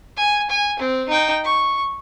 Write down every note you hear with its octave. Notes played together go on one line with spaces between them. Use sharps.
G#5
G#5
C4
D#4 G5
C#6